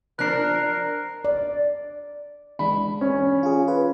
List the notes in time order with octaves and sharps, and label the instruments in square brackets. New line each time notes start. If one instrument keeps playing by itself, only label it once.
[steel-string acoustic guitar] F3 D4 [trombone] A#4 [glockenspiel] F#6 C7
[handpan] D5
[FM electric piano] E3 G#3 D4 [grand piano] B5
[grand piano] C#4
[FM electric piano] F4 G#4
F4 B4